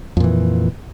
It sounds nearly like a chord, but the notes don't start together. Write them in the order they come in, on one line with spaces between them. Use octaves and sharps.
F2 A#2 E3